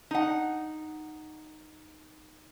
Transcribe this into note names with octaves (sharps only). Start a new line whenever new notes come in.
D#4 F#5